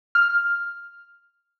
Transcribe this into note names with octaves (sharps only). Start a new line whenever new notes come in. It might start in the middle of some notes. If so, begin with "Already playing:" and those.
F6